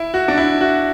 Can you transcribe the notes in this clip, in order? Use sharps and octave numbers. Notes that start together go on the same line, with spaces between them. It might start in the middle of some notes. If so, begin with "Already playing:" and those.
Already playing: E4
F#4
D4
E4
F#4